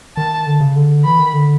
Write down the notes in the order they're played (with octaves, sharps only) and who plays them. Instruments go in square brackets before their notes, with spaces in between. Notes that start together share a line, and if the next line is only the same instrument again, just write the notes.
[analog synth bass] D#3 [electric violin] A5
[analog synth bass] D3
C#3
D3
[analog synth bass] E3 [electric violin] B5
[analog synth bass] D#3
D3